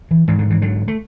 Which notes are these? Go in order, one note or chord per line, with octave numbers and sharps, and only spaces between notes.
E3
G#2 E3
D3
E3
D3 F#3
A3